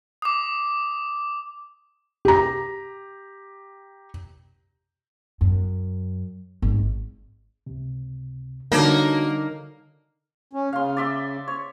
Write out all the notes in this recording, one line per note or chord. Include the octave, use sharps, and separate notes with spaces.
D6 D#6
G4 A#5
F#2
G#1
C#2 C3
D3 G3 A#3 D#4 F#4 C#5
C#4
C#3 F5 C6
D5 E5 C6
C#5